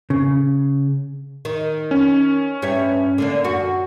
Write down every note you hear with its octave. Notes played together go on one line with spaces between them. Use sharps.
C#3
D#3
C#4
G2 C#5 E5
D3 A#3 D4
F#2 F#4